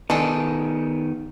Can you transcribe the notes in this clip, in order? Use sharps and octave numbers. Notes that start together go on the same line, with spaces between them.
D#3 G#3 B3 D4 A4